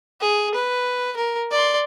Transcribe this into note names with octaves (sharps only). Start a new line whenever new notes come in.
G#4
B4
A#4
D5 C6